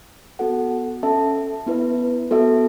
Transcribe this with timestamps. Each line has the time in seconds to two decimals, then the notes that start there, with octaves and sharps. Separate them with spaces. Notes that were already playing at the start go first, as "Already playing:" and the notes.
0.39 B3 F#4 A4 F#5
1.03 C#4 A4 E5 A5
1.67 B3 E4 B4 E5
2.31 B3 F#4 A4 E5